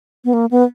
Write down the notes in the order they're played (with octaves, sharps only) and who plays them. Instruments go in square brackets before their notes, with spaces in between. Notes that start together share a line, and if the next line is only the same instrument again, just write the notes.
[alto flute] B3
A#3
B3